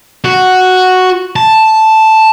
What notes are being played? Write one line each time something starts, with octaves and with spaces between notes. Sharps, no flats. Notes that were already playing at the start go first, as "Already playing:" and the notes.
F#4
A5